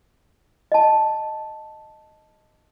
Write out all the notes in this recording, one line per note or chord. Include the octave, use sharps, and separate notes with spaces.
D#5 A5